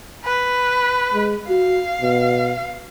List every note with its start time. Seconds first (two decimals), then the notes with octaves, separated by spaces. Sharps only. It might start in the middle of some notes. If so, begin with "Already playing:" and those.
0.25 B4
1.14 G#3
1.49 F#4 F5
2.02 B2